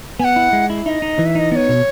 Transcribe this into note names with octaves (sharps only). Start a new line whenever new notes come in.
B3 F#5 G#5
E4
G#3
E4
D#4 D#5 E5
D#4
E3
E5
D#4 D#5
B3 C#5 D#5
B2